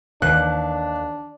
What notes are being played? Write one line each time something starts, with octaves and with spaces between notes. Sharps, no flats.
D#2 D#3 E3 D4 F#6